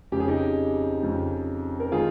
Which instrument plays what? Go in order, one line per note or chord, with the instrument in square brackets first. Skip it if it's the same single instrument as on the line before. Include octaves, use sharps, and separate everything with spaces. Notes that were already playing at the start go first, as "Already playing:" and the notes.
[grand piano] F2 C#3 G4
G#4
D#4 G4
F2 C#3
A#4
D#3 F4 G#4